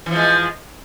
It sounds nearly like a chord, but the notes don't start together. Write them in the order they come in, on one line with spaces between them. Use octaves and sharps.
E3 F3 G#3